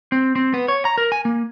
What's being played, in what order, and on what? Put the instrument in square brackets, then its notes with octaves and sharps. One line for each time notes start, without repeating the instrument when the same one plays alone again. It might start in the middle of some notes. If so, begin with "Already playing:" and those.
[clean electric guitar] C4
C4
B3
C#5
A#5
A#4
G#5
A#3